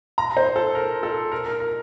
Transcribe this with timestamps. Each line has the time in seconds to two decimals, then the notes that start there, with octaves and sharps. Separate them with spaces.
0.18 A#5
0.37 C5
0.56 A4
0.75 A#4
1.03 A4
1.32 A#4
1.46 A#4
1.60 A#4